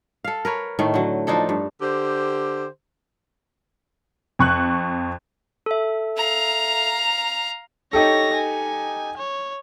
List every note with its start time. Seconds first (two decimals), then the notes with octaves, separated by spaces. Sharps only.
0.24 A4 F5
0.45 A#4 B4 C#5
0.79 A2 D#3 A3
0.94 D3 F#3
1.27 F3 D4 D#4 A4
1.49 G2
1.81 D3 G4 C5
4.39 F2 C#6 F#6
5.66 A4 E5
6.17 F5 A#5
7.93 D#4 G4 A4 C#5 A#6
8.34 G#5
9.17 C#5